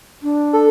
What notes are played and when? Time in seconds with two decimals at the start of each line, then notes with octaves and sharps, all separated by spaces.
0.23 D4
0.53 A4